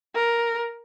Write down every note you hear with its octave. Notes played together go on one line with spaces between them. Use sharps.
A#4